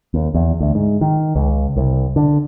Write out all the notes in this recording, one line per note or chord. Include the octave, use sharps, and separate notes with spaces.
D#2
E2
D2
G#2
D#3
C#2
C2
D3